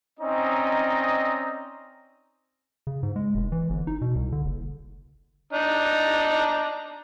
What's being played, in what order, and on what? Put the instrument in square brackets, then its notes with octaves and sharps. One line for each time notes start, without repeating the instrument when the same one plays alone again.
[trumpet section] C4 C#4 D#4 D5 D#5 A#5
[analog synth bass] C#3
G#2
G#3
F1
E3
G1
D#4
B2
C2
D3
F#1
[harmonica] D4 D#4 A#5